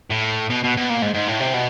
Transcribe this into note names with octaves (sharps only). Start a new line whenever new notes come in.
A2
B2
B2
B2
A#2
G#2
G#2
A2
C3
B2